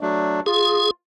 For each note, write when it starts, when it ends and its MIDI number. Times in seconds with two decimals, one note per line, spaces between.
0.01 0.40 54
0.01 0.40 57
0.01 0.40 62
0.46 0.88 65
0.46 0.91 68